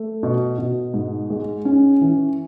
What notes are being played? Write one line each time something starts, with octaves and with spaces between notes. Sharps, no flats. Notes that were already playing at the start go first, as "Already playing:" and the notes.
Already playing: A3
B2
B2
G#2
G#3
C#4
E3